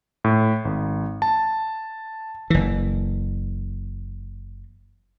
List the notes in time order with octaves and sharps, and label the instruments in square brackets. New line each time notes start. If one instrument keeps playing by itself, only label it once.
[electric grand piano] A2
G#1
A5
[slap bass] F#1 E3